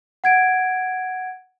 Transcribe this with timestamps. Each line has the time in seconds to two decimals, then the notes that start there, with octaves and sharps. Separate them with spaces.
0.24 F#5 G#6 D7